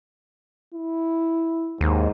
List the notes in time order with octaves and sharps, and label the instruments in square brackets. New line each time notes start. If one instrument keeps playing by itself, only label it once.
[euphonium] E4
[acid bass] D#2 [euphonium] G#2